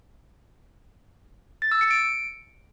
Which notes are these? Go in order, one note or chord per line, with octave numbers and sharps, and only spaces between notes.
A6
E6
C#7
D7